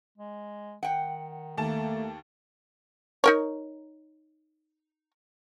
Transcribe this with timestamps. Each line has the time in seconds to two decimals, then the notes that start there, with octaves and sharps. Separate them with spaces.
0.18 G#3
0.83 D#3 F#5 G5
1.58 D#2 A3 A#3 A5
3.24 D#4 A#4 C#5